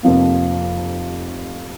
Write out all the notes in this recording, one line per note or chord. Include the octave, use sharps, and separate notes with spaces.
F1 F2 C3 F3 A#3